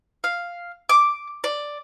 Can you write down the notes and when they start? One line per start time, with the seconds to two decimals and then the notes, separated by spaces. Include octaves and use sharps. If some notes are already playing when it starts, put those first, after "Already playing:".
0.24 F5
0.89 D6
1.44 D5